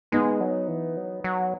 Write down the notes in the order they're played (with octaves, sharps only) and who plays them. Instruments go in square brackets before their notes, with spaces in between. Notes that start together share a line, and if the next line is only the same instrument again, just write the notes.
[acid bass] G#3 [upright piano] B3 D#4
[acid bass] F#3
E3
F#3
F#3